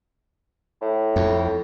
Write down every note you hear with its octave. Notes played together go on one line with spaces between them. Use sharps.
A2
F2